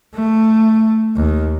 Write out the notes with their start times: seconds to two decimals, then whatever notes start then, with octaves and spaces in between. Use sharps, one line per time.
0.14 A3
1.16 D#2